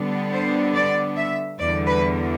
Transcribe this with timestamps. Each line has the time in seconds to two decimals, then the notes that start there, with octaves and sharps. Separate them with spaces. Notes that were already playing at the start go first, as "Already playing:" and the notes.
Already playing: D3 G3 B3 D4
0.33 C5
0.75 D5
1.17 E5
1.59 E2 D3 G3 D5
1.86 B4